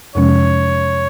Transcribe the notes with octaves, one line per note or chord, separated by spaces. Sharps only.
F2 C3 F3 G#3 C#4 C#5